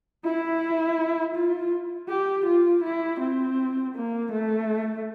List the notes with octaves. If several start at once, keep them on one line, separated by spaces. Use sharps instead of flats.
E4
F4
G4
F4
E4
C4
A#3
A3